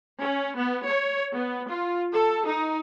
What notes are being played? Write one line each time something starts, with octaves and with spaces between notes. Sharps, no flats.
C#4
B3
C#5
B3
F4
A4
D#4